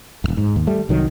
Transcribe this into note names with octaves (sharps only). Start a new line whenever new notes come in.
E1 F#2
G#2
D#2
G3 A3
C2 D#3 F#3